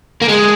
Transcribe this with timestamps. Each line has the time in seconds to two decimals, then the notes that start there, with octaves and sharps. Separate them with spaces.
0.22 A#3
0.29 G#3